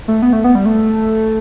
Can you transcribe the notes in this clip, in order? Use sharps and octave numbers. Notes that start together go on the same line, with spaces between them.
A3
B3
A3
B3
G3
A3